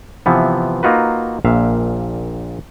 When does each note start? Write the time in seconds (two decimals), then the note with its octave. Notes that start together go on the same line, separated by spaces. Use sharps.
0.26 C3 E3 F3 B3
0.83 A#3 D#4 F4 F#4 B4
1.45 A#1 A#2 E5 F5